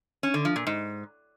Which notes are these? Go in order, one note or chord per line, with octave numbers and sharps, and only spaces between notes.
C#4
D3
F3
A#2
G#2